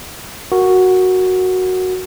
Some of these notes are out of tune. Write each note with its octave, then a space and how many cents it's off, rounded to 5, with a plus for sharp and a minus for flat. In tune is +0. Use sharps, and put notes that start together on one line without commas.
F#4 +0 A#4 +0